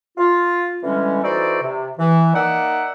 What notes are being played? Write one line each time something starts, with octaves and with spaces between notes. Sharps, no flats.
F4
D3 E3 G3 G#3 C#4
E3 D#4 F#4 A4 C5 D5
C3
E3
A#3 D#4 D5 E5 F#5